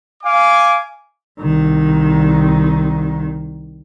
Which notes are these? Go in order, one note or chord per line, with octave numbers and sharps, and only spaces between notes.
F5 G#5 D6
C2 D#3